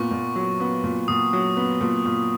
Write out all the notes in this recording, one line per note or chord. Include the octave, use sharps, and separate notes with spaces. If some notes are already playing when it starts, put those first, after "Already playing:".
Already playing: A#2 B3 C#6
A#2
F#3
B3
A#2
A#2 D#6
F#3
B3
A#2
A#2